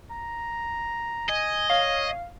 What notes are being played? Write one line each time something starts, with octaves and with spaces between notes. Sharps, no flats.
A#5
D#5 G#5
C#5 F5 C7